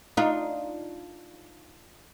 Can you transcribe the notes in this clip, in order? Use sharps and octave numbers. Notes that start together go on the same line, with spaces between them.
D4 D#4 F4